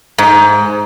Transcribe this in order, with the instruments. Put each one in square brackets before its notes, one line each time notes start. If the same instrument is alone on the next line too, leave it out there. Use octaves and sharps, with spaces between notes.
[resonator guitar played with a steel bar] G#2